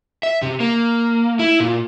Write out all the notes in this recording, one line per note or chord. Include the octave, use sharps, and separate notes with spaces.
E5
C3
A#3
E4
A#2